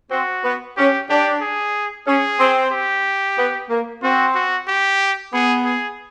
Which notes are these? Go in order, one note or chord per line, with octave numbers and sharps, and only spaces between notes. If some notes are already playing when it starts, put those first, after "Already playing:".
C4 F#4
B3
C#4 G4
D4 G4
G#4
C#4 G#4
C4
G4
B3
A#3
C4 F#4
F#4
G4
B3 G#4
G#4